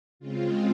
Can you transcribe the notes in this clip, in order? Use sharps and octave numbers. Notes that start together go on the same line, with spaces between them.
C#3 G#3 C4 F4